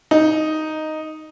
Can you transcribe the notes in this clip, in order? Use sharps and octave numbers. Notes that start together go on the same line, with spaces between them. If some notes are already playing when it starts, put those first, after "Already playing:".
D#4